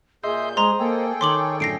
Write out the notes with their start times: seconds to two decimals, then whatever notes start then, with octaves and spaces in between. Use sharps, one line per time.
0.24 A#2 G#4 D#5 E5 C6 G6
0.57 G#3 C5 D#5 A#5 C6
0.79 A#3 G#4 A4 G5
1.21 D#3 C#5 C6 D6 F#7
1.60 F#2 A2 D3 A#6 C7 D7